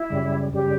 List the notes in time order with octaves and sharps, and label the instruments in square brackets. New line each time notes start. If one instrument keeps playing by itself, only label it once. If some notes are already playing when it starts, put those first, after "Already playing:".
Already playing: [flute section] E4
[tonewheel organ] F#2 C#3 G3
[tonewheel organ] F#2 C#3 G3 [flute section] G4